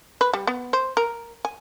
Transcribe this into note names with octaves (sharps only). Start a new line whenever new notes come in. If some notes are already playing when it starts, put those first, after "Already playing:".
B4
G3
B3
C5
A#4
G#5